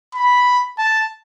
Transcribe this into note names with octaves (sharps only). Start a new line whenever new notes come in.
B5
A5